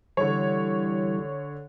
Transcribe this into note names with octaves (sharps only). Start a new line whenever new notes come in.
D3 E3 G3 C#5